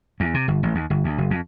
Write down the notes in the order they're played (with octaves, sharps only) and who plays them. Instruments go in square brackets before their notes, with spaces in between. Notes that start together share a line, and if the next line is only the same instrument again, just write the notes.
[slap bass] E2
C3
G1
A1
D#2
G1
D2
F#1
F2